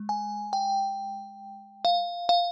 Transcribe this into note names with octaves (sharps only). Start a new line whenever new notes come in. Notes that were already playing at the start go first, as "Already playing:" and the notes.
Already playing: G#3
G#5
G5
F5
F5